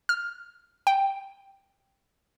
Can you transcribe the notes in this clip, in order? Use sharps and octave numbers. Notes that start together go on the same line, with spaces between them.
F6
G5